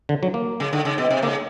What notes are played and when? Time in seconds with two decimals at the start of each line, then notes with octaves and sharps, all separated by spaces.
0.09 D3
0.23 F#3
0.34 A#3
0.60 C#3
0.73 D3
0.85 C#3
0.98 B2
1.11 C3
1.23 C#3 A#3